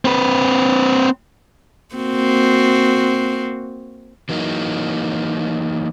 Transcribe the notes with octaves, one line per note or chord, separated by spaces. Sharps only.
C4 B4
A#3 C4 F#4
E3 F#3 A#3 D#4